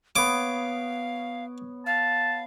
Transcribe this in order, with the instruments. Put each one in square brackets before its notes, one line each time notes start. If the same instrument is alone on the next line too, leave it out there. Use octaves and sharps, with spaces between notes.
[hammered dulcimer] B3 C#5 [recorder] F5 [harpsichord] D6
[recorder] F5 [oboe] A5